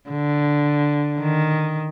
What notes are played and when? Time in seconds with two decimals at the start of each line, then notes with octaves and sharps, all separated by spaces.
0.10 D3
1.20 D#3